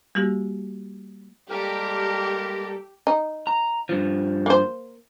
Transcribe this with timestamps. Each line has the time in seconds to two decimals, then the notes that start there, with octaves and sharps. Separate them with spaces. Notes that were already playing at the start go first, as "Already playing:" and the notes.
0.15 G3 A#3 F#4 G4
1.50 G3 G#3 A#3 G4 A4 A#4
3.07 D#4
3.47 A#5
3.89 G2 F3
4.46 A#3 C5